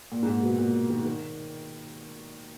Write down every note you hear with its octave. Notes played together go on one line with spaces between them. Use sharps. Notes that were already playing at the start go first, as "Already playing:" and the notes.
A#2
G#2
A#2
B2
A#2
D#3
D#3